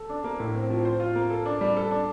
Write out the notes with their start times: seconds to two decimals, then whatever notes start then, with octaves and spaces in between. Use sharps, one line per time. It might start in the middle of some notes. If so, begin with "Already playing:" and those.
Already playing: A4
0.09 D4
0.24 A#3
0.40 A2
0.55 C4
0.70 F3
0.85 C5
1.00 F4
1.15 A#3
1.30 A4
1.46 D4
1.61 G3
1.76 A4
1.91 D4